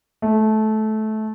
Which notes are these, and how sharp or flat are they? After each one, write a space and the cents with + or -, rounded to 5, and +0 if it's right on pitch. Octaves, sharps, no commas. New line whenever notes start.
A3 -20